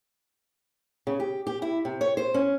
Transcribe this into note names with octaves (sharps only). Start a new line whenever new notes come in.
C#3
G4
G4
E4
C3
C#5
C5
C#4